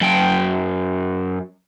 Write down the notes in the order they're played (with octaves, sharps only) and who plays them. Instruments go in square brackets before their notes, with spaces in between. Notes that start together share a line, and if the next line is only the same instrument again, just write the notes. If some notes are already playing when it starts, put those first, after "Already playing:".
[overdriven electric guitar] F#2 G5